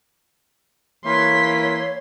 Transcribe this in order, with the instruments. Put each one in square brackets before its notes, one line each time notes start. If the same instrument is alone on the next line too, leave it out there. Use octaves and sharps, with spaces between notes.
[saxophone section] E3 A#3 [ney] C#5 [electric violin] C6 B6